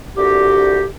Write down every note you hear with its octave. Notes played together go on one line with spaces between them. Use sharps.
C2 D3 F#4 G4